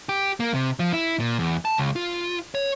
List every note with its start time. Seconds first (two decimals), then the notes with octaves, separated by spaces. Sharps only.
0.09 G4
0.40 A#3
0.54 C3
0.79 F3
0.93 E4
1.20 A#2
1.39 E2
1.65 A5
1.78 C#2
1.96 F4
2.55 C#5